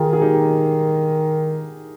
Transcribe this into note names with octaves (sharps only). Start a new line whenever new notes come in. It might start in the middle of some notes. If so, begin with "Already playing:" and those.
Already playing: D#3 F4 G#4
G#4
D#4 G4